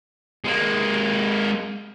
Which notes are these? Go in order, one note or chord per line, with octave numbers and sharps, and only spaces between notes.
G#3 A#3